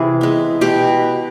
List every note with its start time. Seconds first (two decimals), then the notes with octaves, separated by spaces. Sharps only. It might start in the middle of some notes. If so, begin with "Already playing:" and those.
Already playing: C3 E3 G#4
0.21 G#3 B3
0.61 B2 G4